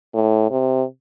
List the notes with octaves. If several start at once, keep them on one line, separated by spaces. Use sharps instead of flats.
A2
C3